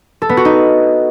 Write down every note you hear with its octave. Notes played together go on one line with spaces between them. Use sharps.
A4
B3
F#4
D#4